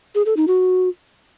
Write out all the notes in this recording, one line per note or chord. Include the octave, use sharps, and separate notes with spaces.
G#4
A4
D#4
F#4